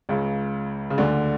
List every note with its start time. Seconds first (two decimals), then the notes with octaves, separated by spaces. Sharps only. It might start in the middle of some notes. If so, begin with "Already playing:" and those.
0.09 C#2 C#3
0.90 C#3
0.98 D2 D3